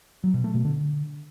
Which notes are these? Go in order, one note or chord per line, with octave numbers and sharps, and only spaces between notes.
F#3
B2
A3
B2
D3